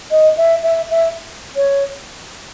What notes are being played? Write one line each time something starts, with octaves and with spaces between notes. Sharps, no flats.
D#5
E5
E5
E5
C#5